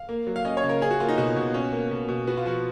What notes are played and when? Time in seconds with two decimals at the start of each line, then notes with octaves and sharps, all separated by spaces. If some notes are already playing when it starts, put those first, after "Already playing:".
Already playing: F5
0.09 A#3
0.27 F#3
0.36 F5
0.45 C#4 D#5
0.57 C#5
0.63 C#3
0.69 A#4
0.81 C#4 G#4
0.91 F#4
1.00 A#3 F4
1.09 D#4
1.17 B2 F#4
1.36 B2
1.54 C#4
1.72 A#3
1.91 B2
2.08 B2
2.27 B3 F#4
2.37 F4
2.46 F3 F#4